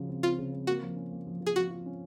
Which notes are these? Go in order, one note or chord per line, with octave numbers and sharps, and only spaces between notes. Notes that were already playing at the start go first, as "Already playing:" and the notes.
Already playing: C#3 F3 F#4
C4
C4 F4
C#3
C4
A#3 F#4
F3
C#4
A#3
F3
F3
G#4
F3 F#4
F4
C#4